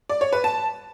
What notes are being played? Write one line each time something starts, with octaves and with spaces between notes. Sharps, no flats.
D5
C#5
B4
A5